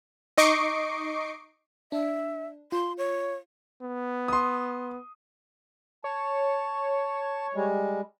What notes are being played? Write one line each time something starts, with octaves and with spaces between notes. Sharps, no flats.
D#4 D#5 C#6 D6 C7 D7
D4 E5
F4 C6
C#5
B3
C6 D#6
C#5 A5
G3 G#3